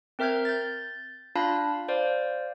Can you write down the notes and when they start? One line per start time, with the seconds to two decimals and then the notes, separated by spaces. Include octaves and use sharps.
0.19 C4 A#4 E5 F6 G6 G#6
0.45 G6 A6
1.35 D4 F4 F5 A5 B5 F#6
1.88 C5 D5 F5